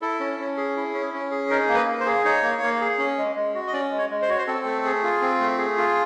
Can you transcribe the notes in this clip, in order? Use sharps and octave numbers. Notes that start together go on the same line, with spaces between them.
E4 A4
C#4
C#4
G#4
E4
C#4
C#4
G#4
D#4 A#4
A#3
B4
A#3
C5
G#4
D#4 C#5
A#3
A#3
G#4
C#4
G#3
G#3
F#4
D#5
C#4 D5
G#3
C#5
G#3
C5
F#4 C#5
C5
C4 A4
A3
G#4
F4
C4
A3
G#4
F4